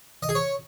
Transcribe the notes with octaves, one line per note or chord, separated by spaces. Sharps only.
D#5
G#4
C#5